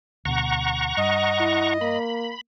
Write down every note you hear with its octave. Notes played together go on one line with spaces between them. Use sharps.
D2 B2 F#5 A#5 C#6
G2 D#5
E4
A#3 B5